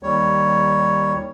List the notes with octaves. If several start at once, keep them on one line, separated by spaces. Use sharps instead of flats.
D#2 G3 C#5